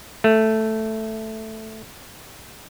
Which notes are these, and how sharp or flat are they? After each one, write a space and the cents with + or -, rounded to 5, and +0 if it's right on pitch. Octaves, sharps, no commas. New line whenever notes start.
A3 +0